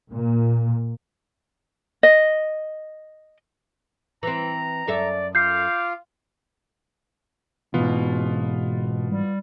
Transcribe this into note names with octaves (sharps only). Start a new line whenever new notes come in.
A#2
D#5
E3 C4 A#5
F#2 A4 D5 E5
F4 F5 D6 G6 C7
G#2 B2 E3 B3 F4
G3